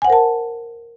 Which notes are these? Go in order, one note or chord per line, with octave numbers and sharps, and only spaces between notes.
A#4 C5 F#5 G#5 A5